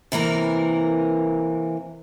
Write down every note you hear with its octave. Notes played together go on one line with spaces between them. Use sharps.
C3 E3 A#3 A#4